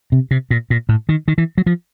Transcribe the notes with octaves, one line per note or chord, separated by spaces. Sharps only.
C3
C3
A#2
A#2
A2
D#3
D#3
E3
F#3
F3